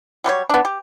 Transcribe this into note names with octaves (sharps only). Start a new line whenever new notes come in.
F#3 G3 B4 C#5
B3 D4
G4